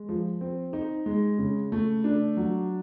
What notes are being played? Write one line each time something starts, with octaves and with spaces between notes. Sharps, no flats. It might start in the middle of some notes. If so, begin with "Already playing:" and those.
Already playing: G#3
F3
C4
D#4
G#3
C#3
A3
D4
F#3